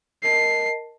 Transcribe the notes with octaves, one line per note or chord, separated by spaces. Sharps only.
A#4 D#5 A5 C7